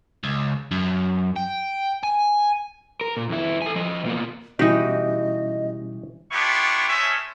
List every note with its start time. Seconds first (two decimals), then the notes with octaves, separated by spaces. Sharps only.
0.24 C#2
0.71 F#2
1.36 G5
2.04 G#5
3.01 A#4
3.17 A#2
3.29 F2 E4
3.62 A4 G#5
3.76 F3 D#5
4.05 B2 A#3
4.59 B2 E3 G3 C#4 D#4 F#4 G4 D#5
6.32 B3 D4 E4 F4 G4 C#6
6.89 G#3 A3 C#4 C5 C#5 E5